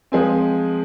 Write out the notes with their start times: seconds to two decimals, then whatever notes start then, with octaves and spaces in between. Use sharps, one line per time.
0.12 F3 G#3 C4 G#5